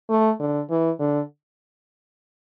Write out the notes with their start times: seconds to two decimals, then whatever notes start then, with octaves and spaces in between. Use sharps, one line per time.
0.10 A3
0.40 D3
0.70 E3
0.99 D3